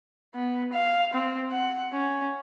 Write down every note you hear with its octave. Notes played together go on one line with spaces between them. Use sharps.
B3
F5
C4
F#5
C#4